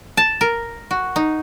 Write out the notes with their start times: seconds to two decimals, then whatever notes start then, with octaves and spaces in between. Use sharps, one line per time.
0.17 A5
0.41 A#4
0.91 F#4
1.16 D#4